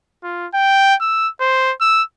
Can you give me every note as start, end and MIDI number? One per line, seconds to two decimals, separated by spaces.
0.23 0.47 65
0.54 0.95 79
1.01 1.29 88
1.41 1.73 72
1.81 2.03 88